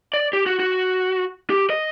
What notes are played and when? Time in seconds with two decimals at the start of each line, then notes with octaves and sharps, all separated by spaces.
0.14 D5
0.33 G4
0.46 F#4
0.59 F#4
1.50 G4
1.70 D#5